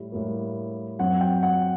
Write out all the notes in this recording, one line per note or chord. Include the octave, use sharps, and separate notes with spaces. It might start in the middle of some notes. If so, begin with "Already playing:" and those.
Already playing: A2 G3
A2 G3 A#3
F#2 F#3 C4 F#5
G5
F#5